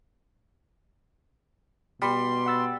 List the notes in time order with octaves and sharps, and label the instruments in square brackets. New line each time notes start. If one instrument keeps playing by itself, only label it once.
[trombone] B2 [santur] G3 [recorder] C6
[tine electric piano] F#5 E6 A6